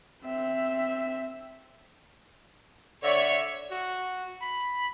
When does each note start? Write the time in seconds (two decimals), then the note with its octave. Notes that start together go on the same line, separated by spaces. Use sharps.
0.23 C4 E5
3.03 D3 C#5 E5
3.71 F#4
4.41 B5